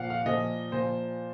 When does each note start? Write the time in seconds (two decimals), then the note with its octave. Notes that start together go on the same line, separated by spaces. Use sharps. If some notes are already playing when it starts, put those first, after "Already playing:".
Already playing: A#2 F3 F5 F#5
0.10 F5
0.26 A#2 F3 D#5
0.72 A#2 F3 C5